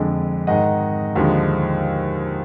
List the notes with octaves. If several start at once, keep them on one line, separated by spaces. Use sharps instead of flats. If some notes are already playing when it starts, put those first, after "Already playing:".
Already playing: F2 D3 G#3
G#2 D#3 G#3 D#5 F#5
D#2 D3 F3 G#3